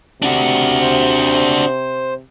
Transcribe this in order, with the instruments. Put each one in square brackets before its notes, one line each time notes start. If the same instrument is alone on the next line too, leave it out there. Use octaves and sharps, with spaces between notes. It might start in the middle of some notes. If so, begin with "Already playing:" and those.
[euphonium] C3 [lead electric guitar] D4 F#4
[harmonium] C5